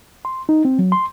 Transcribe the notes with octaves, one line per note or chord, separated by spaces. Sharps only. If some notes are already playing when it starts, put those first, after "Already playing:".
C6
D#4
C4
F#3
C6